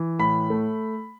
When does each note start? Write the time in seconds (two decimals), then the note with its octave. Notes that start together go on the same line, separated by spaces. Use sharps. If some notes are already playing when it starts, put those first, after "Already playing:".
Already playing: E3
0.19 A2 B5
0.50 A3